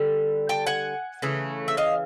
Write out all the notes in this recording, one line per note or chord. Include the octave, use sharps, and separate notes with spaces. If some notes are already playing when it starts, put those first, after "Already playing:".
Already playing: D3 G3
G5 A5
F#5 G#5
C#3 E3 A3
E5
D#5 F5